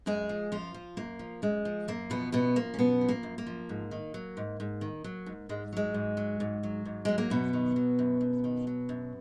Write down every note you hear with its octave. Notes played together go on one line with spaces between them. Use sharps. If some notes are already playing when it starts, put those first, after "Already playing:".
F#2 G#3 G#4
F3
F#2 F3 F4
F3
F#2 A#3
F3
F#2 G#3
F3
F#2 A#3
B2 F3 B3
F#2 B2 B3
F3 A#3
C#4
F#2 B2 B3
F3
A#3
F#2
A#3
F3
G#2
D#3
F#3
G#2
G#2
D#3
F#3
G#2
G#2 G#3
F#3 G#3
G#2
F#3
G#2
F#3
G#2
F#3 G#3
A#3
F#2 B2 B3
D#3
F#3
F#2
F#2
D#3
F#3
F#2